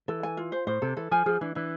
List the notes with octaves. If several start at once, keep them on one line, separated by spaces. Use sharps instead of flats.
E3 A4
G#5
F4
C5
A2 C5
C3 A4
E3 A4
F3 G#5
F3 G#4
E3 D4
E3 D4